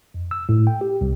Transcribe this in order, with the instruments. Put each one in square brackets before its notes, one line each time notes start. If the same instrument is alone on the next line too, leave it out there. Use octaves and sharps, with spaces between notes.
[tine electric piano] F2
E6
A2
G5
G4
C2